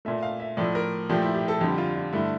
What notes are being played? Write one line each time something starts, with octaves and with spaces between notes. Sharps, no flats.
A#2 A3 E5
F5
E5
A2 F3 A3 D5
A#4
A#2 F3 A3 G4
E4
G4
A4
F2 D3 G3 G4
F4
F4
G2 D3 A3 E4